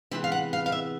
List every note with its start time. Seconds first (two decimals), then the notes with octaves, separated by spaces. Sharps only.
0.11 C3 E3 G#3 B3 E5
0.24 F5
0.32 F#5
0.53 F5
0.66 F5
0.72 E5